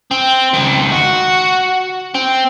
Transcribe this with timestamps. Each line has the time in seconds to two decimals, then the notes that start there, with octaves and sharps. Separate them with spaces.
0.11 C4
0.54 C#2 D#3
0.92 F#4
2.15 C4